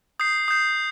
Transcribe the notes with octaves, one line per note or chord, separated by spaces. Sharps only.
D#6 G6 C7
D#6 G6 C7